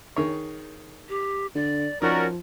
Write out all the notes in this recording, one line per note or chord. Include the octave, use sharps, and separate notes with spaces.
D#3 G#4 C#5
G4
D3 D5
F3 C#4 D#4 F#4 A#4 D5